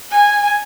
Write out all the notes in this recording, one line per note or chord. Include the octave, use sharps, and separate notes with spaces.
G#5